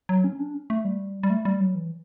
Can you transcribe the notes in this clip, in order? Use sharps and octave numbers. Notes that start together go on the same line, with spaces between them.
F#3
C#4
D4
C#4
A3
G3
G3
A3
G3
F#3
E3